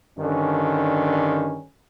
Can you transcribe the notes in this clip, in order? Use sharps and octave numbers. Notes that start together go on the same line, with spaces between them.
G2 D3 D#3 C#4